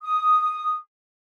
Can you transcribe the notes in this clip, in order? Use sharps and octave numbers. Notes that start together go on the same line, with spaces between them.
D#6